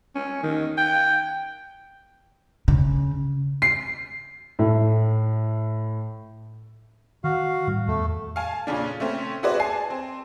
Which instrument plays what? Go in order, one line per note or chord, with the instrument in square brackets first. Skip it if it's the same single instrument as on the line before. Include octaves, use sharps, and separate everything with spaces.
[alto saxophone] C#4
D#3
G5
[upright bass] C#3
[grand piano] C7
A2
[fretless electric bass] D#3 [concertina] F#4 F5
[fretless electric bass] A2 D#3 G3
[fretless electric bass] E2 [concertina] A3
[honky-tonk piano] F5 G#5 A5
A#2 C#3 C#4 D4
A3 C4 C#4
E4 F#4 G#4 B4 C5 D5
G#5 A5 C7
C4